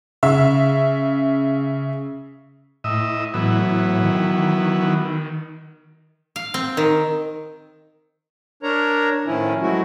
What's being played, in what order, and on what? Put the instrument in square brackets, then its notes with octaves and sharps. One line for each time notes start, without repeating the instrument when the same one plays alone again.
[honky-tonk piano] C#3 E5
[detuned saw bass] A2 [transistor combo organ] D#5 E5
[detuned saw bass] A2 [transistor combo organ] E3 F#3 B3
[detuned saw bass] D#3
[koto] F5
C4
D#3
[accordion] D4 A#4 C#5 A#5
A2 D#3 F3 C#4 E4
F#3 G#3 A3 E4 F#4